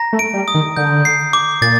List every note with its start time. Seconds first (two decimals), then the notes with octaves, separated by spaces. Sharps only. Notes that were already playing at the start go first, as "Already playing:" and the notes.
Already playing: A#5 A#6
0.13 A3
0.19 D7
0.34 G3
0.48 D#6
0.54 D#3
0.76 D3 G6
1.05 C7
1.33 D6
1.61 A#2 A6